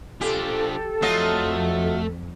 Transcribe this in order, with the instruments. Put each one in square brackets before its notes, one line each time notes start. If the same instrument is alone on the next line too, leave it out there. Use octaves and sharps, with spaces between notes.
[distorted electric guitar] F3 D4 [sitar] G4 [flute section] A4
[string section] F2 [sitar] F#3 F4 D#5 [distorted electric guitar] A3